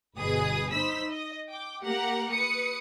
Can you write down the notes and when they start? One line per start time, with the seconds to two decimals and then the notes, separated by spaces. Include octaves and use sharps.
0.18 G1 B2 G#4 B4 D#6
0.72 D#4 C5 B5 E6 B6
1.10 D#5
1.49 G5 D6
1.84 A#3 G4 A#4 F#5
2.31 B4 D#6 C#7